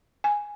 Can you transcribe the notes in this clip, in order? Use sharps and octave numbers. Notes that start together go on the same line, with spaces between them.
G#5